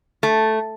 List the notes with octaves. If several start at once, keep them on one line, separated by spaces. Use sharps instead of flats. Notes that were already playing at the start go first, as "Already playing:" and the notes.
A3